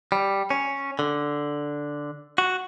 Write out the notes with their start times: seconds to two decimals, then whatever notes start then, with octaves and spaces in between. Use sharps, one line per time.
0.12 G3
0.50 C#4
0.99 D3
2.38 F#4